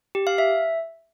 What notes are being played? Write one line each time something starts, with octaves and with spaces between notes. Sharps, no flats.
G4
F5
E5